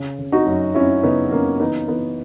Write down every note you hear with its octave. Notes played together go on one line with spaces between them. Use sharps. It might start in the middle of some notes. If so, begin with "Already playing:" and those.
Already playing: C#3
C#3
D#4 F#4
F#2
F#2 C#4 E4
C#3 B3 D#4
C#3 A#3 C#4
E3 B3 D#4
E3 B3